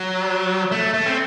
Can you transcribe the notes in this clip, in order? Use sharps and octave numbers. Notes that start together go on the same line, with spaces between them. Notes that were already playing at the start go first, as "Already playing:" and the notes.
Already playing: F#3
A3
A3
C4